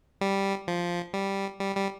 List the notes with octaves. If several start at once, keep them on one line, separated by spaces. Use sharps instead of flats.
G3
F3
G3
G3
G3